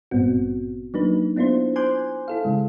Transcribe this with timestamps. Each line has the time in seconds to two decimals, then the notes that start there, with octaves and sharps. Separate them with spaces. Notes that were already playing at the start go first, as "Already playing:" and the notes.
0.11 G#1 G2 A#2 B3 C4 F#4
0.94 F#3 A#3 D4 D#4 B4
1.36 B3 D4 E4 F4 C5
1.76 C5 G#5 C6 D6 F#6 G6
2.28 E4 A4 F5
2.45 C#3 G#3